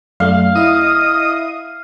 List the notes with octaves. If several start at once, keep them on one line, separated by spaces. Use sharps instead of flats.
F#2 A3 F5
E4 D#5 E5 D#6